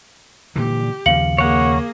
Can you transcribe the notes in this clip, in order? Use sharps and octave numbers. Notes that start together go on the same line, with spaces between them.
A#2 D3 E3 G4
D#2 C#3 F3 F5 C#7 F#7
A#3 G#4 C#5 F#5